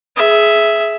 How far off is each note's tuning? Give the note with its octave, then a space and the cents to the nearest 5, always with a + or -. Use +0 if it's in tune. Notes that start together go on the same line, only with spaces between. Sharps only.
G#4 +20 E5 +0